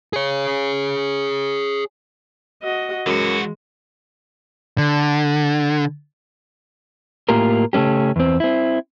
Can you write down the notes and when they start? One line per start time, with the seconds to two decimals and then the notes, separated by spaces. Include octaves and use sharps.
0.13 G#4 C#5
2.63 F#4 D#5
3.06 F#2 E3 G#3 F#4
4.78 D3
7.29 A2 A#3 F4 G4 A#4
7.73 C#3 A3 B3 C#4 G4
8.16 E2 C4
8.40 C4 E4